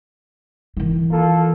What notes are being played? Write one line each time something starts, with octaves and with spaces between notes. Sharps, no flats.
D#3 E3
A#3 F4 A4